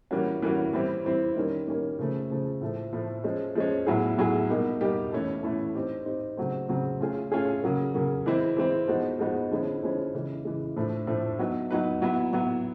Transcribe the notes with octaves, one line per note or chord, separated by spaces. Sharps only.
E3 G3 A#3 C#4 F#4
E3 G3 A#3 C#4 F#4
E3 G3 C4 E4
E3 G3 C4 E4
D#3 G3 A#3 C#4
D#3 G3 A#3 C#4
C#3 F3 A3
C#3 F3 A3
A2 F3 A3
A2 F3 A3
F3 G#3 C#4
F3 G#3 C#4
A2 F#3 B3 E4 G#4
A2 F#3 B3 E4 G#4
B2 G3 A#3 D#4 G4
B2 G3 A#3 D#4 G4
E3 A3 C#4 E4 A4
E3 A3 C#4 E4 A4
C4 D#4 G4
C4 D#4 G4
C#3 F#3 A3 C4
C#3 F#3 A3 C4
A3 C#4 F4 G#4
A3 C#4 F4 G#4
C#3 F#3 A#3
C#3 F#3 A#3
E3 G#3 C4 E4
E3 G#3 C4 E4
F3 G#3 B3 D#4 F#4
F3 G#3 B3 D#4 F#4
D3 F3 G#3 C#4 E4
D3 F3 G#3 C#4 E4
C#3 E3 G#3
C#3 E3 G#3
A2 F3 A3 D4
A2 F3 A3 D4
F#3 B3 D#4 F#4 B4
F#3 B3 D#4 F#4 B4
F#3 B3 E4
F#3 B3 E4